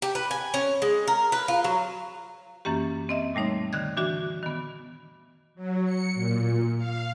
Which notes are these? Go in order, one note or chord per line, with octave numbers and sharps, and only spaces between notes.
G4
B4
G#5
C#4
G#3
A#4
B4
F4
F#3
F#2 E3 A#3 C#4 G4
C4 D#5 E5
A#2 G3 A3 D#4 C#5
D3 D#3 F#6 G#6
E3 D4 F#4 E5 F#6
D#3 B3
F#3
C#7
A#2
F5